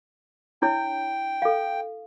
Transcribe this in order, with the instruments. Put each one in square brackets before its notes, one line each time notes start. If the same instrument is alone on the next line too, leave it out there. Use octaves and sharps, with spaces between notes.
[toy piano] D4 E4 C#5 [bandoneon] G5
[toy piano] A4 F5